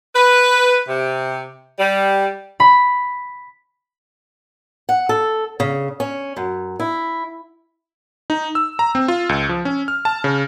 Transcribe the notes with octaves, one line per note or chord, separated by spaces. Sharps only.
B4
C3
G3
B5
F#5
A4
C#3
C#4
F#2
E4
D#4
E6
A#5
C4
F4
C#2
F3
C#4
F6
A5
C#3